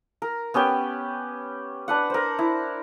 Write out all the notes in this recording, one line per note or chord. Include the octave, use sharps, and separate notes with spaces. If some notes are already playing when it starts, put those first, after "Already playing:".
A#4
B3 C#4 G4 G5
D4 B4 F#5
A#4 C5
E4